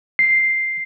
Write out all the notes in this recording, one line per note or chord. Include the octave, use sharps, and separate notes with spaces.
C7